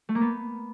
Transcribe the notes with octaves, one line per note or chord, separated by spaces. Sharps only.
A3
A#3
B3